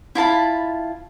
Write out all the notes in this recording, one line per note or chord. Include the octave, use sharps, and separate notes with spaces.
E4 F4 A5 B5